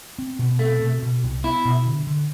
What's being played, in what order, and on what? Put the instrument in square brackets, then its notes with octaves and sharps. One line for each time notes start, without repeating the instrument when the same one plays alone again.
[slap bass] C4
B2
[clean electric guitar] A3 [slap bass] C4
[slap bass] B2
B2
C2
[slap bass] B3 [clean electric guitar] E4
[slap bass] B2
D3
D3